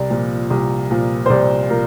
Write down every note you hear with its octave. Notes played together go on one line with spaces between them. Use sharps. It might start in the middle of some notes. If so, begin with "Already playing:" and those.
Already playing: C2 D5
A#2 F3
C2
A#2 F3
C5
C2 D5
A#2 F3 A#4